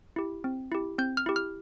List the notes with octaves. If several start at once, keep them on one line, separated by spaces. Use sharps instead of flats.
E4 G4
C4
E4 G4
C4 G6
F6
E4 G4
F6